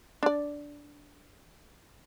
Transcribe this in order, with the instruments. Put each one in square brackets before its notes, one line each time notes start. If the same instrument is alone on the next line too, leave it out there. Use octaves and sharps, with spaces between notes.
[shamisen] D4 D5